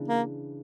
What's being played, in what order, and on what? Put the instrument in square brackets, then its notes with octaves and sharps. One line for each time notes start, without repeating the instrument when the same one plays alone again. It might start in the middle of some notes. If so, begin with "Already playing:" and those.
Already playing: [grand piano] C#3 E3 B3 D4
[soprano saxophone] A#3